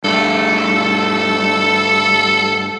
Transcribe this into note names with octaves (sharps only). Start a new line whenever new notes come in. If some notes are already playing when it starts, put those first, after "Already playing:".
G2 A3 A4